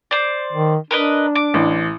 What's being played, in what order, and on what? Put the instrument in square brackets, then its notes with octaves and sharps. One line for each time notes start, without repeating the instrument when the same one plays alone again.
[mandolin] C5 D5
[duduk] D#3
[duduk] D4 [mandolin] A#4 B4 D#5
[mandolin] D6
[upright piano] A1